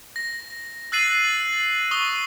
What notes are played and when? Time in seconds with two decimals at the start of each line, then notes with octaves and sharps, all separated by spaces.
0.16 A#6
0.92 E6 F#6 A6 C7 D#7 F#7
1.91 C#6 D#6 G7